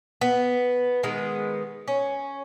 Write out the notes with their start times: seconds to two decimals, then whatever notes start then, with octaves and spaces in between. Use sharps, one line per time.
0.21 B3
1.03 D#3 G#3 B3
1.88 C#4